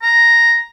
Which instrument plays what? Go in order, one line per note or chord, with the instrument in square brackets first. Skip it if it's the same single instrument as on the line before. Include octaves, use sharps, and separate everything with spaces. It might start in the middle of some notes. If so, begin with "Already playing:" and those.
[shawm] A#5